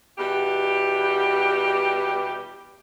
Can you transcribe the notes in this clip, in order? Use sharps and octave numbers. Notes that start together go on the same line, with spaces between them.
E2 B2 G3 G4